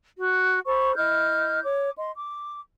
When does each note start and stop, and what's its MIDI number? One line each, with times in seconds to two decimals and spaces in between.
0.18 0.59 66
0.67 0.95 69
0.67 0.95 72
0.67 0.95 83
0.67 0.95 85
0.96 1.62 64
0.96 1.62 75
0.96 1.62 89
0.96 1.62 91
1.63 1.90 73
1.63 1.90 86
1.96 2.10 75
1.96 2.10 84
2.16 2.60 86